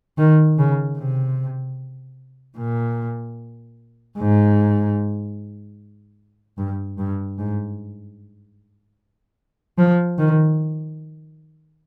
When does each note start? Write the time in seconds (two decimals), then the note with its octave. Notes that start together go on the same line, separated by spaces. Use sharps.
0.18 D#3
0.58 C#3
0.98 C3
2.58 A#2
4.18 G#2
6.58 G2
6.98 G2
7.38 G#2
9.78 F3
10.18 D#3